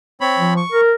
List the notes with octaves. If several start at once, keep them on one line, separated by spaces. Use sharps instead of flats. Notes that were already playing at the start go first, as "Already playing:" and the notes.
C4 C#5 B5
F3
C#6
A#4